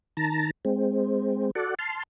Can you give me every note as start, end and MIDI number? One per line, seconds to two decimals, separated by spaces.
0.17 0.51 51
0.17 0.51 81
0.17 0.51 82
0.65 1.51 56
0.65 1.51 60
1.55 1.75 66
1.55 1.75 69
1.55 1.75 74
1.55 1.75 78
1.79 2.03 81
1.79 2.03 84
1.79 2.03 89